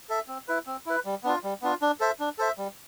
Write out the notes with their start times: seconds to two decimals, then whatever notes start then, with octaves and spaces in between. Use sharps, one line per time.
0.09 A4 E5
0.28 C4
0.48 E4 B4
0.67 C4
0.86 E4 B4
1.05 G3
1.24 B3 D4 F4
1.44 G3
1.62 B3 D4 F4
1.82 D4
2.00 A4 C5 E5
2.20 D4
2.38 A4 C5 E5
2.58 G3